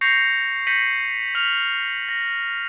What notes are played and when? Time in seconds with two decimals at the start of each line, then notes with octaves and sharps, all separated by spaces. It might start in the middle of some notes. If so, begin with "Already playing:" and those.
0.01 C#6 G6 A#6 C7 C#7 F7
0.67 G6 A#6 B6 C#7 D#7 F#7
1.35 F6 B6 F7 F#7
2.09 A#6